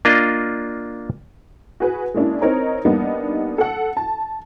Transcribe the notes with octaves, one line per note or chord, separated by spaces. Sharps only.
A#3 D4 F4 D#5
F#4 G#4 B4
G#3 A#3 C#4 D4 E4
C4 D#4 A#4 C#5 A#5
G3 A#3 B3 D4 D#4
A4 F#5
A5